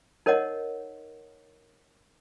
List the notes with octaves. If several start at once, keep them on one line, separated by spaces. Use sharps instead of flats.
D#4 A#4 C#5 D#5 F#5